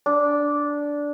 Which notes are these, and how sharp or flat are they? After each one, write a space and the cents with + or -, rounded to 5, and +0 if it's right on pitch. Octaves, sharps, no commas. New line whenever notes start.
D4 -10